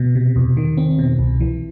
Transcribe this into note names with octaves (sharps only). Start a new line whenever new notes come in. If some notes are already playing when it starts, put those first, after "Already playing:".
Already playing: B2
C3
E2
D#3
C4
B2
C2
E3